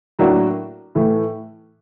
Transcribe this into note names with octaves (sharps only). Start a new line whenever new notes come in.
A2 F#3 A#3 D4 F#4
A2 E3 A3